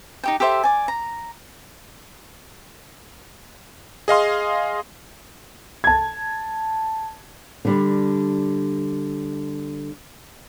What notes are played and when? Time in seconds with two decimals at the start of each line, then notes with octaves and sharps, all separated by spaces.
0.23 D#4 G4 G5
0.40 G4 A4 C5 E5
0.63 D5 G#5
0.88 A#5
4.08 G#4 D#5 F5 C6
5.84 A5 G#6
7.65 D3 G3 D4